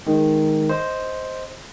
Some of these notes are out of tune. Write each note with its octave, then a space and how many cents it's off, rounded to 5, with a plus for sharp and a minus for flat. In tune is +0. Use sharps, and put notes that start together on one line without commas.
D#3 +0 G#3 +0
C5 +0 D#5 +10